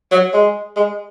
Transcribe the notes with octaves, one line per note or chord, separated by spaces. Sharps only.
F#3
G#3
G#3